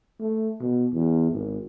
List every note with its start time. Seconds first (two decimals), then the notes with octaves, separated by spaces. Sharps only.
0.20 A3
0.60 B2
0.93 E2
1.31 G#1